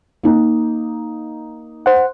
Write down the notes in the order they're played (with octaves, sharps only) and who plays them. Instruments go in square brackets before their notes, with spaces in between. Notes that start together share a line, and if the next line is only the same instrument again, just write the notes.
[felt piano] A#3 D#4
[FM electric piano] C5 F#5